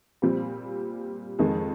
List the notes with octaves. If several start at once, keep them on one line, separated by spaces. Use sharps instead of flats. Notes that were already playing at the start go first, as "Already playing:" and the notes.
A#2 G3 C4
F2 D#3 G#3